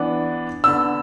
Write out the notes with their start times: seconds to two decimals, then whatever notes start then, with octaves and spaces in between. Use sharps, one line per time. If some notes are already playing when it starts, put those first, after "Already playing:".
Already playing: E3 B3 D4
0.64 D3 B3 D4 E6